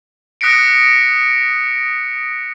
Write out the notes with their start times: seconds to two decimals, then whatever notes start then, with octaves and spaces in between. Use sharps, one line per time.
0.41 D#6 F#6 A#6 B6 C#7 D7